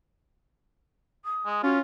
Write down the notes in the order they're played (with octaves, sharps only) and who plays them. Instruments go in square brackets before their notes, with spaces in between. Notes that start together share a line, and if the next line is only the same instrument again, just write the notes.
[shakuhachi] D#6
[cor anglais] G#3
[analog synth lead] C#4 [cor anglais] F4 [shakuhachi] F#4